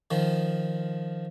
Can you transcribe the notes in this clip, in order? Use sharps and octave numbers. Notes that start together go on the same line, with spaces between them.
D#3 F3